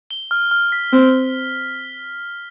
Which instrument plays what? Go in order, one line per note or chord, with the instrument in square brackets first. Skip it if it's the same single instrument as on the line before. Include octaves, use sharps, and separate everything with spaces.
[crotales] G7
F6
F6
B6
[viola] C4 [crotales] F6